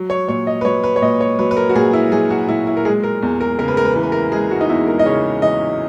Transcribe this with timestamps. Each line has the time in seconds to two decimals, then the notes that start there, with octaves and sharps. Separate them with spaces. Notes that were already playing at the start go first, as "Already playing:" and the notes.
Already playing: F#3
0.10 C#5
0.28 A#2 C#5
0.47 D#5
0.61 B4
0.65 F#3 C#5
0.84 B4
0.96 C#5
1.02 A#2 D#5
1.21 C#5
1.39 F#3 B4
1.51 B4
1.57 A#4
1.69 F#4
1.75 A#2 G#4
1.93 E4
2.12 F#3 G#4
2.30 F#4
2.48 A#2 E4
2.67 E4
2.77 A#4
2.85 G#3 G#4
3.03 A#4
3.22 E2
3.41 A#4
3.58 C#3 A#4
3.68 B4
3.77 A#4
3.85 B4
3.94 E3 A#4
4.03 B4
4.12 A#4
4.32 G#3 G#4
4.51 F#4
4.61 D#4
4.69 E2 E4
4.87 A#4
4.99 D#5
5.05 C#3 C#5
5.42 E3 D#5